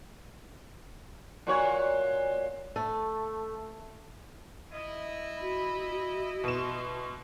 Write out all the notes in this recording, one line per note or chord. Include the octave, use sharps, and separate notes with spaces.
A#2 F#4 C#5
A3
E4 D#5
F#4 B5
B2 C6 E7